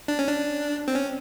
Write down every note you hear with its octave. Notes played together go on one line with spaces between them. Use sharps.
D4
C#4
D4
C4
C#4